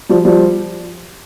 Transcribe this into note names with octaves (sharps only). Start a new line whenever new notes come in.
F3 G3
F3 G3